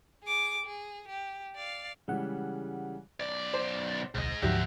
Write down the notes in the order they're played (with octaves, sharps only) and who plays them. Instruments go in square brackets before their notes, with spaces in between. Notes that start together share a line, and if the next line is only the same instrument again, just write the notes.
[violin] G#4 D6
G#4
G4
D5 F5
[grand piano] C#3 E3 G3 [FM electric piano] G#3 F#5
[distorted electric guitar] B1 D5
[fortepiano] C5
[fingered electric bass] D1 B1 [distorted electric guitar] G#2 D#5
[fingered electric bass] D2 G#2 F3 [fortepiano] F#3 G4 [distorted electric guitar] F#4 E5